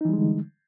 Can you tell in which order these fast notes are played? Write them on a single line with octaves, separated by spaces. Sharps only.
D#4 E3 G3 G#3 D3